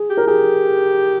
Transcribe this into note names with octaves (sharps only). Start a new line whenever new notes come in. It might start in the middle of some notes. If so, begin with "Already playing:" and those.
Already playing: G#4
G4
A#4
G4 G#4